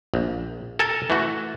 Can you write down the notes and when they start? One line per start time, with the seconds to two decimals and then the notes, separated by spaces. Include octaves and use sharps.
0.14 A#1
0.79 A4 A#4 G#5 A5
1.10 E3 A3 F#4